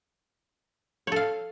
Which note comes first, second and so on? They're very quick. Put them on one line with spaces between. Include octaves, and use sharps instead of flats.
C#5 A4 F5